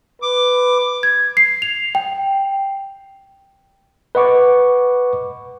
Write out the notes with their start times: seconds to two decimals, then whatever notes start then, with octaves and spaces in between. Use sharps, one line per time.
0.22 B4 D6
1.03 G#6
1.37 C7
1.62 F7
1.95 G5
4.15 B4 D#5 F#5 C#6 D6